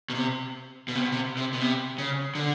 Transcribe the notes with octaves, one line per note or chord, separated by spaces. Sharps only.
B2
C3
B2
C3
B2
C3
C3
B2
C3
C#3
D3